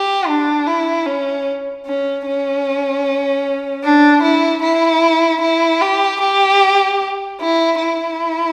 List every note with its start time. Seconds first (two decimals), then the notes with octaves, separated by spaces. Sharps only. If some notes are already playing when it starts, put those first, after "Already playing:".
Already playing: G4
0.27 D4
0.67 E4
1.06 C#4
1.86 C#4
2.26 C#4
3.84 D4
4.23 E4
4.63 E4
5.42 E4
5.82 G4
6.21 G4
7.41 E4
7.80 E4